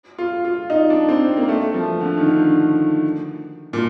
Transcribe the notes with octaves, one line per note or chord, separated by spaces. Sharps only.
F4
F4
D#4
D4
C4
A#3
A3
F3
D3
D#3
D3
A#2